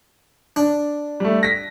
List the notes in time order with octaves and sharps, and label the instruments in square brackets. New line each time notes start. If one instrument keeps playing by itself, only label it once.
[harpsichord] D4
[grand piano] G3 A3
A#6 B6